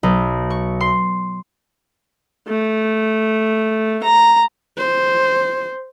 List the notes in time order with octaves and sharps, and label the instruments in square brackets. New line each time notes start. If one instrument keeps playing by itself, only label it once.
[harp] B1
C#6
C6
[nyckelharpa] A3
A#5
[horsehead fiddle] C5